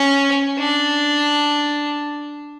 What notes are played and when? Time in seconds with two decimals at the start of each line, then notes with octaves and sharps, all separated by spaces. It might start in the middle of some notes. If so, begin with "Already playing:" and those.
Already playing: C#4
0.59 D4